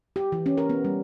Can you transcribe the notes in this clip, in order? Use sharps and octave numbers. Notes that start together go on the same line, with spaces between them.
G4
E3
C#4
A#4
B3
G3